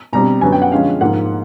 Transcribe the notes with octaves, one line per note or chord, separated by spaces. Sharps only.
B2 G3 C4 A#5
F#2 D3 F#3 B3 G#5
G5
F#5
D3 F3 G#3 C#4 F5
G#2 F3 A#3 F#5